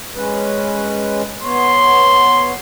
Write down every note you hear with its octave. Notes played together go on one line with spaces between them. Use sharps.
G#3 C#4 B4
B3 C#5 C6